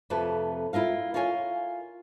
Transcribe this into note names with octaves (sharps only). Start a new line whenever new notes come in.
F2 C3 A3 B4
E4 F4 A#4 F5
F4 A#4 C#5 F5 G#5